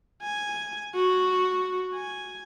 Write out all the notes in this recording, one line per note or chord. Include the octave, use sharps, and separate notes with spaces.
G#5
F#4
G#5